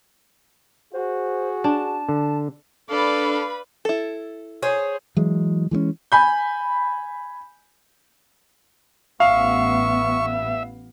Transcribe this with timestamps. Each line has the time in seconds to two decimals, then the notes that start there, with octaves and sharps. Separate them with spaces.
0.94 F#4 G#4 C5
1.64 D4 A5
2.09 D3
2.90 D4 A4 B4 D5 F5 B5
3.85 E4 A4
4.63 G#4 C5 C#5
5.17 E3 F#3 G#3
5.71 E3 G#3 A3 C#4
6.12 G#5 B5 G6
9.20 A1 B3 E5 F5 C#6